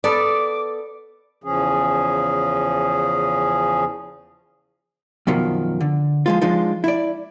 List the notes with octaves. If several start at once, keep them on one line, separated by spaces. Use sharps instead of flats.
B3 A4 D5 D6
E2 C#3 F3 C#4 G#4
F#2 B2 D#3 F3
D3
F3 G#3 F4
F3 G#3 D4 D#4 F4
E4 D5